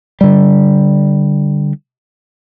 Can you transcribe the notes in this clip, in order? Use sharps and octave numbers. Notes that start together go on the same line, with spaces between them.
D3 G3